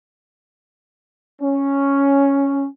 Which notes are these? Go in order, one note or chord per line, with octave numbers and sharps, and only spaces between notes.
C#4